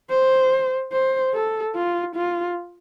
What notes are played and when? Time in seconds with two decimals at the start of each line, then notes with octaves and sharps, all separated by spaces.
0.10 C5
0.92 C5
1.34 A4
1.75 F4
2.16 F4